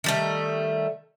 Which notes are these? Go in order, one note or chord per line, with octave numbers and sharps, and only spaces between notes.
D#3 G3 A3